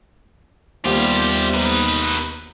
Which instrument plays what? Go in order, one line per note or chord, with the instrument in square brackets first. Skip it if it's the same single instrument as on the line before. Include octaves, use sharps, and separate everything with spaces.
[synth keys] D#2 B3 [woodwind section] C3 G3 [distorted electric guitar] F4 G4
[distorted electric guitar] D#4 B4